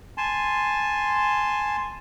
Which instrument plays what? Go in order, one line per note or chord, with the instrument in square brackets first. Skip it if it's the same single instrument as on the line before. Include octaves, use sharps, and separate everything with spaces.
[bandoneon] G#5 A5 C6